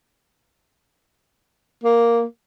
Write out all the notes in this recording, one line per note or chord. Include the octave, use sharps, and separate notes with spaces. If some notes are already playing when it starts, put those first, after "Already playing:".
A#3